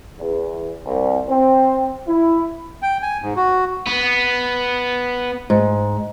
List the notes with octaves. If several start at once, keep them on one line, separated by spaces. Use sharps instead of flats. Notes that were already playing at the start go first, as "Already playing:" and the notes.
E2
C2
C4
E4
G5
G#5
G#2
F#4
B3
G#2